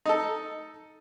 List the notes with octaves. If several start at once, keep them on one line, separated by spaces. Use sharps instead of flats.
D#4 A4